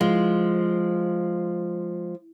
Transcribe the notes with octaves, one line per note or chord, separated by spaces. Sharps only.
F3 G#3